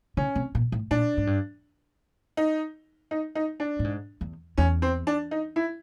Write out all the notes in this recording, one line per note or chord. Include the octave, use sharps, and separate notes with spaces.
C#3 C#4
C3
A#2
A2
A#2 D4
G#2
G2
D#4
D#4
D#4
D4
A2
G#2
E2
E2 C#4
C4
D4
D#4
E4